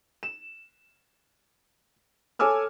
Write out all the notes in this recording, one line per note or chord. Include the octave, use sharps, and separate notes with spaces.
E7
A4 C#5 G#5 D6 E6 F6